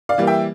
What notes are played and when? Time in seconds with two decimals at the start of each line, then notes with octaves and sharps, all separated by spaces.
0.09 D5 F5
0.18 E3 G3 A#3
0.27 E5 G5